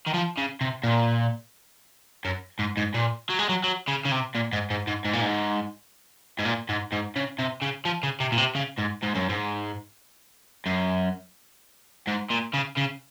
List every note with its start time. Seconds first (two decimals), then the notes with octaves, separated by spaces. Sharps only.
0.07 D#3
0.14 F3
0.38 C#3
0.61 C3
0.84 A#2
2.25 F#2
2.59 G#2
2.77 G#2
2.94 A#2
3.30 F#3
3.39 G#3
3.49 F#3
3.64 F#3
3.88 C#3
4.06 C#3
4.12 C3
4.35 A#2
4.53 G#2
4.70 G#2
4.87 G#2
5.05 G#2
5.13 A#2
5.22 G#2
6.39 G#2
6.45 A#2
6.69 G#2
6.92 G#2
7.16 C#3
7.39 C3
7.62 C#3
7.85 F3
8.03 C#3
8.20 C3
8.32 A#2
8.38 C3
8.55 C#3
8.79 G#2
9.03 G#2
9.15 F#2
9.29 G#2
10.66 F#2
12.07 G#2
12.30 A#2
12.53 C#3
12.77 C#3